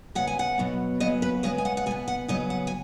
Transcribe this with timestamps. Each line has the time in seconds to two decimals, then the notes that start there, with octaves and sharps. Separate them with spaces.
0.15 C#3 B3 F#5
0.27 G#5
0.39 F#5
0.58 B2 F#3 B3
1.00 C#3 F#3 B3 D#5
1.22 B4
1.43 C#3 G#3 B3 D#5
1.58 G#5
1.65 F#5
1.77 F#5
1.86 B2 G#5
1.91 B3
2.08 F#5
2.28 C#3 F#3 B3 D#5
2.50 F#5
2.67 G#5